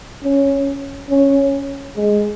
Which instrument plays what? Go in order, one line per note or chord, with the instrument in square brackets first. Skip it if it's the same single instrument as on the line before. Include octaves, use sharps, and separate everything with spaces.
[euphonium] C#4
C#4
G#3